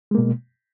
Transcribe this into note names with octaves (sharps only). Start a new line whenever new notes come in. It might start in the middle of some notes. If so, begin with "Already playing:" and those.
B2 G#3 A#3